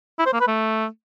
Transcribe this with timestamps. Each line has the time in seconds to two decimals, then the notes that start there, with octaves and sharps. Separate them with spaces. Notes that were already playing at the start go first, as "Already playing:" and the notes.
0.19 E4
0.26 C5
0.33 A#3
0.40 B4
0.48 A3